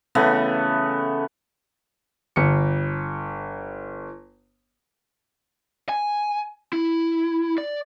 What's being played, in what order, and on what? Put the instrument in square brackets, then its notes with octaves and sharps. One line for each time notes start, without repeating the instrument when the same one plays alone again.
[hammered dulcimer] C#3 E3 A3 B3
[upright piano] G1 C#7
[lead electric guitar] G#5
E4
D5